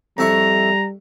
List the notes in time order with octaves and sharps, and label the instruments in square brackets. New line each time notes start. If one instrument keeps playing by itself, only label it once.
[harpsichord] F2 E4 C#6 [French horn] G3 [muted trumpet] A#5